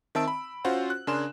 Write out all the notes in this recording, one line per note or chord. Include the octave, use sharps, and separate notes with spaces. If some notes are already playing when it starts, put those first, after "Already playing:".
D#3 C4 E5 A5 E6 D7
B5
C#4 F4 F#4 C5 F#5
F#6
C#3 D4 A#4 G#5 C6 E7